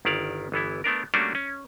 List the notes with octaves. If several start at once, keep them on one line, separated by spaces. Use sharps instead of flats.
G1 D#3 E4 D5 F5
G1 E3 B3 E4
A3 B3 D4 A#4
G3 A3 A#3 C#4 D4 F#4
C#4